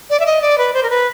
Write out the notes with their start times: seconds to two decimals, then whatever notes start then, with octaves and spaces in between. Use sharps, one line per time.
0.10 D5
0.20 E5
0.26 D#5
0.42 D5
0.58 B4
0.74 C5
0.83 A#4
0.90 B4